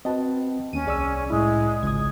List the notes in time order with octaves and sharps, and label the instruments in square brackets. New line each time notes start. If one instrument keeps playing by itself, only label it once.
[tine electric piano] C4 F#4 B4 [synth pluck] D#5 A5
[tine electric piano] D#2 [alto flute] C#4 [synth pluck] D#7
[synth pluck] C2 D5 C#6 [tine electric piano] G#4 E6
[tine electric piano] A2 E4 [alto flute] G#3
[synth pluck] G#1 G#6 [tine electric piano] C#2 D#6